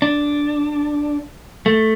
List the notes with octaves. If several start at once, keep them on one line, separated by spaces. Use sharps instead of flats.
D4
A3